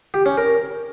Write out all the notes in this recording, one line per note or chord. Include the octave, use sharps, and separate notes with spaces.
G4
C#4
A#4